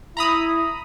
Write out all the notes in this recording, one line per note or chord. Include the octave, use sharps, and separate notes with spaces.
E4 A#5 B5 D#6